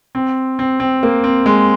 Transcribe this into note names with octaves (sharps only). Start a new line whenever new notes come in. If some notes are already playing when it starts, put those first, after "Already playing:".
C4
C4
C4
A#3
C4
G#3